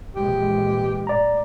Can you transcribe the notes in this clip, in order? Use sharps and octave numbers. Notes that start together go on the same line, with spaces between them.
A#1 E3 G#3 G4
A2 D5 A#5